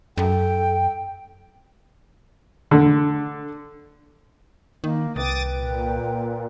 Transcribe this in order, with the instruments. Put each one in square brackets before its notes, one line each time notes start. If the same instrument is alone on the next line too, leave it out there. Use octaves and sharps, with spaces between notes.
[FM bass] F#2 [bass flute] A4 [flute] G5
[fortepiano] D3
[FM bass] D#3 [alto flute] A#3
[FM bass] C2 [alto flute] B4 [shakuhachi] G5 [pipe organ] D6 D#6 A6
[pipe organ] A#2